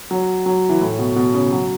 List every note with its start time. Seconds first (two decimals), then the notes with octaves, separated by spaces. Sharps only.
0.11 F#3
0.46 F#3
0.69 E3
0.81 A2
0.99 B2
1.16 B2
1.34 C#3
1.52 F#3